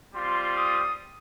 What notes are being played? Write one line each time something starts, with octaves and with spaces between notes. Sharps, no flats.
G3 C4 F4 C6
D#6